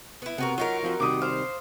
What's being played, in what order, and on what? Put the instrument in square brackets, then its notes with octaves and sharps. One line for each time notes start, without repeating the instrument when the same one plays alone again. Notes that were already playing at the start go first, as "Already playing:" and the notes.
[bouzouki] B3 E4
[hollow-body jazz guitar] C3 [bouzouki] B3 F#4 A#4 [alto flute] F#5
[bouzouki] F#3 D#4 A#4 [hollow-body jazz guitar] F4
[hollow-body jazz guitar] F3 C4 F4 [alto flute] F#4
[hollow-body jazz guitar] C3 D#3 G3 [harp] D6 D#6
[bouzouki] C5 [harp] F5 C6